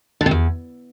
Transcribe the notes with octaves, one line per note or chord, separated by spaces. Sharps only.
D3
C3
E2